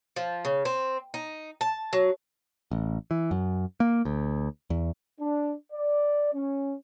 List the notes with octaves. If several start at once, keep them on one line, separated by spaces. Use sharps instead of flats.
F3
C#3
C4
D#4
A5
F#3
A1
E3
F#2
A#3
D2
E2
D4
D5
C#4